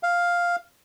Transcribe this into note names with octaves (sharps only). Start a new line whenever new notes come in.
F5